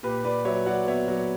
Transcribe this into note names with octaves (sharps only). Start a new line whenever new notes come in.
A#2 G4 B4
A#2 B4 D5
F#3 C#5 E5
F#3 D5 F#5
B3 C#5 E5
F#3